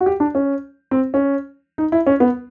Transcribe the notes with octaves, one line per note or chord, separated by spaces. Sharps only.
F#4
G4
D4
C#4
C4
C#4
D#4
E4
C#4
B3